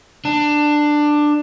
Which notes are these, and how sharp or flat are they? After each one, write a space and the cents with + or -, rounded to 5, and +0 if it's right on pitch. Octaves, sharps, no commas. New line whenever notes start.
D4 +15